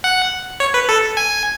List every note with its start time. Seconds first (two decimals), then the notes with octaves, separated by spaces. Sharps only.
0.04 F#5
0.60 C#5
0.74 B4
0.89 A4
1.17 G#5